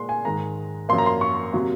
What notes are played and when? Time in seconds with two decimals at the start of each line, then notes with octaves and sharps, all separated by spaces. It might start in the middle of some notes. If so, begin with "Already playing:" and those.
Already playing: A#2 G#3 C6
0.09 G#5
0.25 G#2 D#3 G#3 A#5
0.89 F#2 F3 A#3 C6
0.98 A#5
1.06 C6
1.21 C#6
1.53 C3 F#3 A#3